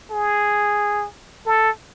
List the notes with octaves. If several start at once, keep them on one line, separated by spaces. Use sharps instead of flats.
G#4
A4